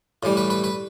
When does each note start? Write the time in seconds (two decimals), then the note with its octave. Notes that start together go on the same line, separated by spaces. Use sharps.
0.23 A2 E3 G3
0.37 B4
0.50 B4
0.64 B4